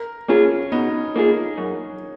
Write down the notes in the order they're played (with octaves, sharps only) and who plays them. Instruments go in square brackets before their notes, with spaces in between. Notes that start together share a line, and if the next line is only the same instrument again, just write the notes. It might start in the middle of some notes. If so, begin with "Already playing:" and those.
Already playing: [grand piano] A#4
[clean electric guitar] A#3 F4 G#4 [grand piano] C#4
[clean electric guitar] B2 [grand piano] D#4
[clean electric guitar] A#3 F4 G#4
F#2